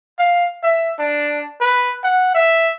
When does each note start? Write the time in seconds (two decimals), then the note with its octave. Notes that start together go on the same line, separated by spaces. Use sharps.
0.18 F5
0.63 E5
0.99 D4
1.61 B4
2.03 F#5
2.35 E5